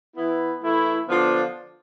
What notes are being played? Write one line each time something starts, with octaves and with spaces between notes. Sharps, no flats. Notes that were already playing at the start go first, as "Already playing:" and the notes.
E3 B3 E4
E3 A3 E4
D3 F3 B3 D4 F4